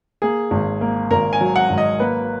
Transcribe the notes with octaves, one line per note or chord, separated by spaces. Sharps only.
A#3 G#4
G#1
A#3
G#1 A#4
G#5
F#3
F#5
G#1
D#5
A#3 B4